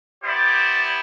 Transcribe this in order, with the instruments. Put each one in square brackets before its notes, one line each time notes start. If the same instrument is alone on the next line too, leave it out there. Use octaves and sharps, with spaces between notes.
[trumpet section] B3 E4 G4 C5 D5